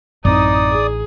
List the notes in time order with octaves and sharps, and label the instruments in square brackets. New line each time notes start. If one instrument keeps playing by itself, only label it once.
[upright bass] A1 [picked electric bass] F#2 C4 [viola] D#4 [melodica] D5 D#6
[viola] G#4